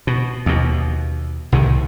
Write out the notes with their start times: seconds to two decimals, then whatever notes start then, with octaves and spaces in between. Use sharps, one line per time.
0.07 B2
0.46 D#2 B2
1.52 C2 A2 D#3